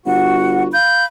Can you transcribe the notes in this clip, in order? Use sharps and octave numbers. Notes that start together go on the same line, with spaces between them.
G1 F#4 F#5
F5 B5 G6